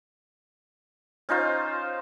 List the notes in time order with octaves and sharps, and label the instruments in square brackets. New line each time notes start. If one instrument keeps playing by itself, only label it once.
[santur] C#4 D#4 F4 C5